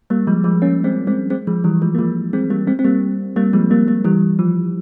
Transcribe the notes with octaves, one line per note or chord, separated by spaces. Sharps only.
G3 A#3
F3 G#3
F3 G#3
A#3 C#4
G#3 C4
G#3 C4
G#3 C4
F3 G#3
E3 G3
F3 G#3
A#3
F3 G#3
G#3 C4
G3 A#3
G#3 C4
C4
G3 A#3
G3 A#3
F3 G#3
G3 A#3
G3 A#3
E3 G3
F3